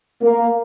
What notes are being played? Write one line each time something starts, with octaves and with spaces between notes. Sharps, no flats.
A#3